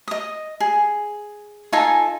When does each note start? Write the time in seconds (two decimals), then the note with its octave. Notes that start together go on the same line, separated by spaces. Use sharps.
0.08 D#5 D#6
0.60 G#4
1.73 D#4 F4 A4 G#5